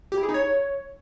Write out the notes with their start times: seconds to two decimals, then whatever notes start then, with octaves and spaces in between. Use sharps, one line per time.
0.12 G4
0.17 E4
0.23 G#4
0.29 D#4
0.34 C#5